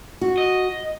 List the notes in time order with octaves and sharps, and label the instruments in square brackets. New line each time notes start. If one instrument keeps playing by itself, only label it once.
[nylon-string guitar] F#4
[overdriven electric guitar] D#5